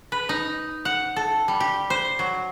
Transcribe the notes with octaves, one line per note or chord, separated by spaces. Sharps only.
B4
D#4
F#5
A4
G3
G4
C5
F#3